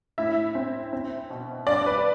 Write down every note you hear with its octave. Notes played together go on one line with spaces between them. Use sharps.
A2 E4 E5
C4
C4
B2
G2 D4 D5
B4